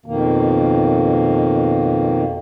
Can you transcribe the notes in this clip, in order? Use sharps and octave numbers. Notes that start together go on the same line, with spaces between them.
F2 B2 D#3 A#3